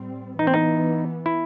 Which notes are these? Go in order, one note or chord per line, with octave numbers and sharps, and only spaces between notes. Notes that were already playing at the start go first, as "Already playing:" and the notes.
Already playing: A2 G3 C4
E3 B3 D#4
C4
D#4
E4